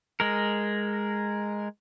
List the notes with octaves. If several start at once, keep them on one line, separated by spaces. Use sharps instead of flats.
G#3 A#4